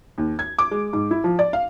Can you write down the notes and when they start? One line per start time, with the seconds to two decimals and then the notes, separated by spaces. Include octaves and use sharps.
0.18 D#2
0.39 G#6
0.59 D6
0.71 G#3
0.93 G#2
1.11 E4
1.24 F3
1.39 D5
1.53 F5